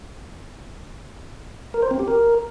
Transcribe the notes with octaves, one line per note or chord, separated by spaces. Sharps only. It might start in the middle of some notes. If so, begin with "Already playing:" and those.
A#4
C5
C4
G4
A#4